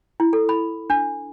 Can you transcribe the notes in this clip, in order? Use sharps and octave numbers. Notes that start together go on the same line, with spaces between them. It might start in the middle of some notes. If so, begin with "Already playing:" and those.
E4
A4
B5
D4